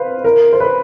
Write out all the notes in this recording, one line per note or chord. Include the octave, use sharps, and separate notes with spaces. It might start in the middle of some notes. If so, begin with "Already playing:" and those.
Already playing: B4 C5 F5
A#4
C5
B4